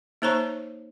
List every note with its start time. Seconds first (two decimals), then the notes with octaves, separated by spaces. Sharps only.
0.22 A#3 D#4 C5 C#5 A#5 C#6